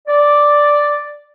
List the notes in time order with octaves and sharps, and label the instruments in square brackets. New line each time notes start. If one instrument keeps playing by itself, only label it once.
[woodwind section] D5